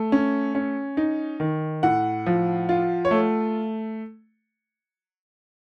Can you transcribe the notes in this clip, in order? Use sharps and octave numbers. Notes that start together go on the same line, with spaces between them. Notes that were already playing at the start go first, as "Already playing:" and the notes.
Already playing: A3
C#4
C#4
D#4
D#3
A2 F#5
F3
F4
C#5
A3